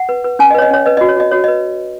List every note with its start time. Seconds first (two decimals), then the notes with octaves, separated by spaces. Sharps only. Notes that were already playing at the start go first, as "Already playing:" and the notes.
Already playing: F#5
0.09 B4
0.24 B4
0.39 C#4 G#5
0.51 D#5
0.54 B4 C#5
0.62 D#5
0.70 C#4 C#5
0.86 B4 D#5
0.97 F#4 D#5
1.09 C#5
1.16 F#4 D#5
1.31 F#4 C#5
1.44 B4 D#5